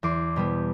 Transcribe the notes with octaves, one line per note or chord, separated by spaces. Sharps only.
E2 C6 D6
B2 G3 B3